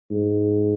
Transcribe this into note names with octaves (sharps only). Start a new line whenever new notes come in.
G#2